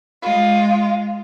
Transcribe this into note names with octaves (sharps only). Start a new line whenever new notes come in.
G#3 F4